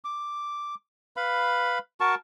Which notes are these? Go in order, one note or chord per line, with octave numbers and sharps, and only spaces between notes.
D6
B4 F5 B5
F#4 A#4 A5 C#6